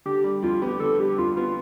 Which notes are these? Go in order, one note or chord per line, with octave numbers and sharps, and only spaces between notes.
D3 G4
G3
F2 F4
B3 G4
D3 A4
G3 G4
F2 F4
B3 F4